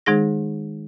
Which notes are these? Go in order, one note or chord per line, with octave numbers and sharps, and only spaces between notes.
D#3 G#3 D#4 G#4 A#6